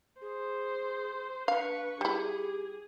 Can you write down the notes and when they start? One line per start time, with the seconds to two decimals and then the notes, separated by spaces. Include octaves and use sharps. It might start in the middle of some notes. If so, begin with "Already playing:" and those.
0.21 G#4 C5
1.48 D4 B4 F5 C#6
2.01 G3 E4 G4 G#4